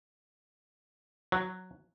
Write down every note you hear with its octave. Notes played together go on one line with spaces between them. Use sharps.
F#3